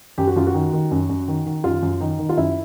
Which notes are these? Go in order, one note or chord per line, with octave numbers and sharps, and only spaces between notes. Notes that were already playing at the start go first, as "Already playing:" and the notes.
F#2 G4
F#4
F#2 F4
F#4
D#3
D#3
F#2
F#2
D#3
D#3
F#2 F4
F#2
D#3 D#4
D#3
F4
F#2 E4